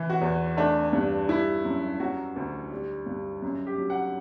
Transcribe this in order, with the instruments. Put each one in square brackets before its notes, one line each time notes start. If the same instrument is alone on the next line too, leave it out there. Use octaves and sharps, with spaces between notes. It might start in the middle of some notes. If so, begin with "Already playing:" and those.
Already playing: [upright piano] E3
F#4
E2
A3 D4
G2
G3 E4
F#2
F#3 F#4
D2
G3
G2
F#2
G4
F#3
F#5